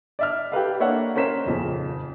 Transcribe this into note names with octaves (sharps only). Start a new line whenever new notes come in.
D5 E5 F6
G4 A4 B4 F5
A#3 D4 C#5 E5 F#5
C#4 A#4 C5 B6 E7
D#1 F2 C#3